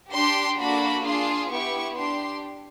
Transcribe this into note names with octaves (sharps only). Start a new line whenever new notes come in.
D4 G4 C6
A#3 D4 F#4 A4 B5
D4 F4 G#4 C6
B3 E4 G4 C#6
D4 G4 C6